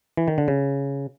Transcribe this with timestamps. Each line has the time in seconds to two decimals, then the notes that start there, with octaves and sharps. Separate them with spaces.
0.17 E3
0.28 D#3
0.38 D3
0.48 C#3